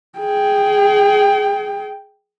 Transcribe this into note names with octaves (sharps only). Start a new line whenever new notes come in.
G#4 G5